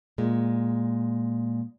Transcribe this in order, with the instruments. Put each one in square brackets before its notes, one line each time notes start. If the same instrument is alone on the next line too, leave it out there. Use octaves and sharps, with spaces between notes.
[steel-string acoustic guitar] A#2 G#3